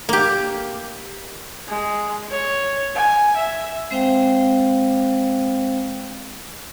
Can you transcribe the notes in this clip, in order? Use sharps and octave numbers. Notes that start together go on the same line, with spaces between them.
A#3 G4
G#3
C#5
G#5
E5
G#3 C4 C5 F5 G5